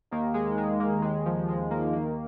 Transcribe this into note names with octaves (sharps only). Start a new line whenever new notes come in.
D#2 D#3 A#3
G#3
G#3
A#3
D#2 D#3 G#3
F3
G#3
A#3
D#2 D#3 A#3